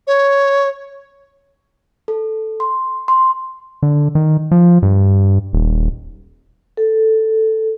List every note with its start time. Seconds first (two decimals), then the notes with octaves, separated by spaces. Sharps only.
0.07 C#5
2.08 A4
2.60 C6
3.08 C6
3.83 D3
4.15 D#3
4.51 F3
4.83 G2
5.53 D#1
6.77 A4